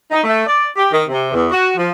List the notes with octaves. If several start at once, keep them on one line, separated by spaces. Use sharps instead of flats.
D#4
A3
D5
G4
D#3
C3
E2
F#4
F3